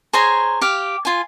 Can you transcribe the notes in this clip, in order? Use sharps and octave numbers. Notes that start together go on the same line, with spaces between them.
G#4 C5 C#5 A#5
G4 F5
F4 G#5